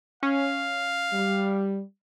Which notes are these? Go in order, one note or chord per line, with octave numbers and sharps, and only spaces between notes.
C#4 F5
G3